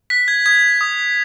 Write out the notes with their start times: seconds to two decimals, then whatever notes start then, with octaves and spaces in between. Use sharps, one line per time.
0.10 F#6 B6
0.28 G#6
0.46 D#6 G#6
0.81 D#6